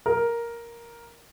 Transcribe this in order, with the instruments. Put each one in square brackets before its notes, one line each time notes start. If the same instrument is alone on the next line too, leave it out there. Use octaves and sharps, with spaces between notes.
[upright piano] A#4